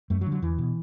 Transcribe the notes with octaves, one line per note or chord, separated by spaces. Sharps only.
F#2 A3
F#3
D3
F#3
E2 E3
B2